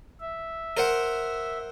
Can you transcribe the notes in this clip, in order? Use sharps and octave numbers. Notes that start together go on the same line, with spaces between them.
E5
A#4 C5 F#5